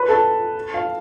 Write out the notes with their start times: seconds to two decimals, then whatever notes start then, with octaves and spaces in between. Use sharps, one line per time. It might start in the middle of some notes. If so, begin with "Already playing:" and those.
Already playing: B4 B5
0.08 A4 A5
0.74 F5